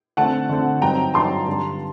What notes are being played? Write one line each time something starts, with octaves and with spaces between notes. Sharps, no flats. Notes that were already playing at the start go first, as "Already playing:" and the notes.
D3 A3 C4 F#5 A5
D3 A3 C4
G2 F#3 C4 D#4 G5 A#5
G2 F#3 C4 D#4 A5 C6
G2 D3 G3 D4